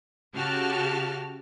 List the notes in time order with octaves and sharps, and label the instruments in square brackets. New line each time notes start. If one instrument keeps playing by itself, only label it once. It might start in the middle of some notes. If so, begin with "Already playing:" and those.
[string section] C#3 F#4 G4 A5 F6